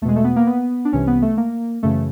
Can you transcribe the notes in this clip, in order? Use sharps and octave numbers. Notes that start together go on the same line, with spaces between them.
E2 B2 G#3 A3
A3
B3
A#3
B3
D4
C2 C3 E3 C#4
B3
A3
A#3
F#2 C#3 E3 A3